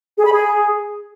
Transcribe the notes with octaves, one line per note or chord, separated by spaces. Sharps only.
G#4
B5
G#4